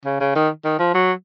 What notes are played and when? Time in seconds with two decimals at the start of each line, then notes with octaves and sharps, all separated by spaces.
0.05 C#3
0.20 C#3
0.35 D#3
0.65 D#3
0.79 F3
0.94 F#3